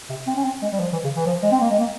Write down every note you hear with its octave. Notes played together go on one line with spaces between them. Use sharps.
C3
C4
C#4
C4
G#3
G3
F3
E3
C#3
E3
F3
G#3
C4
A#3
G#3
A#3